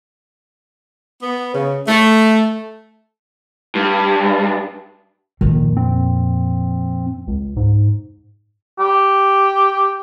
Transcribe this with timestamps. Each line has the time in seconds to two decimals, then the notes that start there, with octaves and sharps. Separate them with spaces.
1.22 B3
1.54 C#3
1.87 A3
3.75 G2
5.41 F2 A#2 D#3
5.77 C4
7.27 C#2
7.56 G#2
8.79 G4